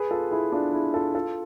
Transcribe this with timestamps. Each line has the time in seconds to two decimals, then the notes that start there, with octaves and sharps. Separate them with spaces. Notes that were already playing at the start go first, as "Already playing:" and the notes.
Already playing: G#4 B4
0.11 F4 A4
0.31 E4 G#4
0.52 D4 F4
0.73 E4 G#4
0.94 F4 A4
1.15 F4 A4